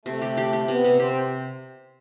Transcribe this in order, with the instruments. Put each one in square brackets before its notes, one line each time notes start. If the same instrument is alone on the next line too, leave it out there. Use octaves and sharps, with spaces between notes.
[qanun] C3 [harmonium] A3
[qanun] G4
G4
G4
[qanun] C3 [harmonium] B3
[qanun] C3
[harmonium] C4 [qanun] G4